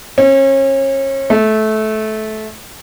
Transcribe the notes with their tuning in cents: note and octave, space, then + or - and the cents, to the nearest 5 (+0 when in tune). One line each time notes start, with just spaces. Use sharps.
C#4 -35
A3 -20